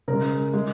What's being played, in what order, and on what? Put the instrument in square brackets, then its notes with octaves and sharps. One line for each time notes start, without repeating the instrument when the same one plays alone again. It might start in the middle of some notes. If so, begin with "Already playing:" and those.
[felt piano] C#3 G#3 A#4
G#3